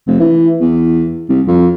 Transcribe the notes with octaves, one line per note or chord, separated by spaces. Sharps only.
F1
E3
E2
C2
F2